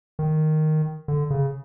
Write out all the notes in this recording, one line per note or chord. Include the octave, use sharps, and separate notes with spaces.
D#3
D3
C#3